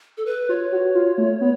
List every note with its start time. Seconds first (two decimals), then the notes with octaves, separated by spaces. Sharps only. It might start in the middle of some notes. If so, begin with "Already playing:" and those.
0.17 A4
0.26 B4
0.49 F4 C#5
0.72 F#4
0.95 F4
1.18 A3
1.41 B3